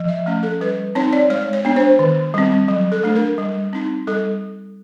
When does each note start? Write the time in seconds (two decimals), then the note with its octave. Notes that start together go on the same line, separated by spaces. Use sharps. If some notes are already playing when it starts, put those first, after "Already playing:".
Already playing: F3
0.08 E5
0.26 A3 C#4
0.43 A4
0.61 G3 B4
0.95 C4 D#4 C#5
1.13 D5
1.30 G#3 C#5
1.53 C#5
1.65 B3 D4
1.76 C5
1.99 D#3
2.34 G3 C4
2.68 F#3
2.92 A4
3.04 A3 D4
3.15 A#4
3.38 G3
3.73 C4 D#4
4.07 G3 A4